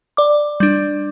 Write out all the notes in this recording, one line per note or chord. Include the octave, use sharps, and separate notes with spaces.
D5 D6
G3 D4